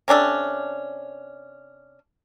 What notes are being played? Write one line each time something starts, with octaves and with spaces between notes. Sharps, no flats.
C3 C#4 D4 A4